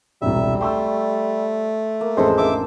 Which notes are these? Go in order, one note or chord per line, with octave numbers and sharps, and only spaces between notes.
E1 C2 G3 E5
A3 G5 C6 C#6 E6
A#3
A1 F2 G#3 A4 B4 C5
A#3 D4 E5 D6